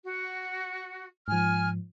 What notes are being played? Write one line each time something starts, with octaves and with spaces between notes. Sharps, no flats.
F#4
G#2 F3 G#5 F6